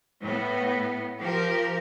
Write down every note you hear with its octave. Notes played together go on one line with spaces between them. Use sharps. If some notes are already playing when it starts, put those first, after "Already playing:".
A2 B3
F3 G4 A#4